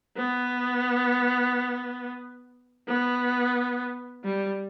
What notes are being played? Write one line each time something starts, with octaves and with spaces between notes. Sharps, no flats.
B3
B3
G3